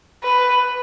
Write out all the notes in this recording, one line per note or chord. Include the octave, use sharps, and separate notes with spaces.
B4